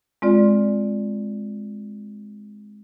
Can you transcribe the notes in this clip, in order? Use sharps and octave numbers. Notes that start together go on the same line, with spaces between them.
G#3 C4 F4 D5